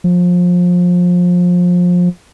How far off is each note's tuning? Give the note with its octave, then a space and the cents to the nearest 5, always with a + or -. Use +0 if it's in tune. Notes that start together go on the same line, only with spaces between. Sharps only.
F3 +25